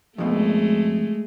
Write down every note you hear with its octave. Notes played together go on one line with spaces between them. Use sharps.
F2 B2 G#3 A3